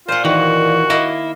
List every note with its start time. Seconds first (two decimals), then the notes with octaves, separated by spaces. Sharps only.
0.08 A#2 F4 C5 F#5
0.25 D#3 E3 F#4
0.90 A#3 E4 D#5 F5